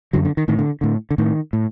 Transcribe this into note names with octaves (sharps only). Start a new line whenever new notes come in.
F#2 D3 F#3
D3
D#3
A2 D#3
D3
A2 D3
D3
A2 D#3
A2